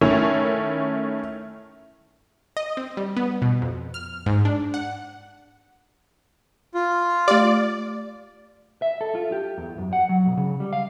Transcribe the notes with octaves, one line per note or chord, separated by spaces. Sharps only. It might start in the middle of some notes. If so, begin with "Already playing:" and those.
D#3 A3 C#4 E4
D#5
C4
G3
B3
B2
F2
F6
G#2
D4
F#5
F4
A3 G4 D5
E5
A4
F4
G4
E2
F#2
F#5
F#3
B1
C#3
G3
F5